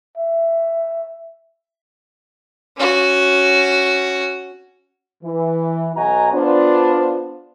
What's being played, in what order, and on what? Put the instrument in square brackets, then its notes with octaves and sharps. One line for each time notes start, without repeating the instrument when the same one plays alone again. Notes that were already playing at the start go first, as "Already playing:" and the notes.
[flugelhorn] E5
[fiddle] C#4 F#4
[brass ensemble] E3
B1 F#4 D#5 G#5 A#5
B3 D4 F4 C5